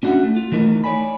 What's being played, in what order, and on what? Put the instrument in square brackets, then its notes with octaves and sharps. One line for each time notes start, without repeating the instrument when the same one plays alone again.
[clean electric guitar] C#4 D4 F#4 A#4 E5 F#5
A3
F4
E3 A3 D#4 A#4
C#5 D5 G#5 B5